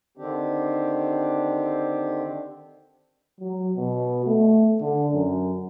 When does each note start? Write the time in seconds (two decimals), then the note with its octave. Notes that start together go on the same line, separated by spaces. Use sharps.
0.17 D3 D#3 C4 D4 G4
3.40 F#3
3.77 B2
4.26 A3
4.81 D3
5.14 F#2